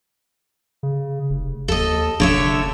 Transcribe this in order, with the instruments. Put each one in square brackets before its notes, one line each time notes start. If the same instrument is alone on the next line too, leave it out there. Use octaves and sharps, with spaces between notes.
[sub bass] C#3
F1
[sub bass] D#2 [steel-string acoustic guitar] A4 D#5
[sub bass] F1 [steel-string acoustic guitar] D3 C#5 E5